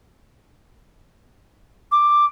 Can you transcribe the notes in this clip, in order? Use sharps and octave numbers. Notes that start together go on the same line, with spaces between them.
D6